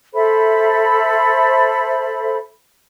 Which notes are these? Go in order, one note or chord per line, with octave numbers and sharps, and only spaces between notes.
A4 C5 E5 B5